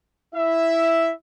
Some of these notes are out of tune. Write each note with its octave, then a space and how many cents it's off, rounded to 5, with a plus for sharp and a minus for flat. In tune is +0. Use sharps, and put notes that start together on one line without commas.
E4 +0 E5 +0